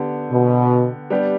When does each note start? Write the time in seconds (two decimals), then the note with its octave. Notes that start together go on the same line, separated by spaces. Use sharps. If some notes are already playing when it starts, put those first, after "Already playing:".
Already playing: D3 B3 G4
0.32 B2
1.10 G3 B3 D4 G4